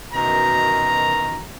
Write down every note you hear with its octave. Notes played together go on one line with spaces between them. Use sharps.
F#2 B2 D#3 E3 A#5